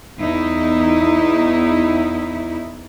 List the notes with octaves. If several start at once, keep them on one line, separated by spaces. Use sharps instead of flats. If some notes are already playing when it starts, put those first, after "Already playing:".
E2 D#4 E4